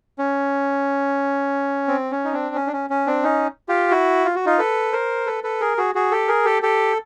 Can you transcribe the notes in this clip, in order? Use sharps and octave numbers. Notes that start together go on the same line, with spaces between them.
C#4
C4
C#4
D#4
C4 D4
C#4
D4
C#4
C#4
C4 D4
C#4 D#4
F4 G4
E4 F#4
F4
F#4
D#4 F4
A4 B4
A#4 C5
A4 B4
A4 B4
G#4 A#4
F#4 G#4
F#4 G#4
G4 A4
G#4 A#4
G4 A4
G4 A4